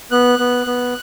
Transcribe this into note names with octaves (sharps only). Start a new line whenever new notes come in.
B3 F#6
B3
B3